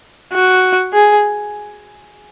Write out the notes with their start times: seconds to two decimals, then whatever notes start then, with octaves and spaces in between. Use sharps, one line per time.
0.33 F#4
0.93 G#4